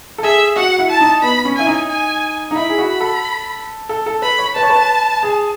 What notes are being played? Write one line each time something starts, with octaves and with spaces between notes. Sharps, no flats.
A4
G#4 E5
F#4 F#5
E4
A5
D#4
B3 B5
C#4
E4 G#5
D#4
G#5
D#4
E4 B5
G#4
F#4
B5
A4
A4
A4
B4 B5
C#5
B4 A5
C#5
B4
G#4